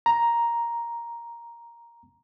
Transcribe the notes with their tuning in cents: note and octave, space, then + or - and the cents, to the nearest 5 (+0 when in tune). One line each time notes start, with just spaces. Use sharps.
A#5 +5